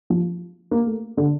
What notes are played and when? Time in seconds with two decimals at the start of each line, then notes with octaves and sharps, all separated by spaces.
0.10 F3
0.71 A#3
0.86 A3
1.17 D3